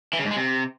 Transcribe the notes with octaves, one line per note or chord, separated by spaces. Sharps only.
E3
C#3
G#2
G#3
C3